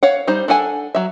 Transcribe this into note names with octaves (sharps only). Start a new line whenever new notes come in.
C#5 F5 F#5
G3 D#4 C5
D4 A4 F#5 G#5
F#3 E5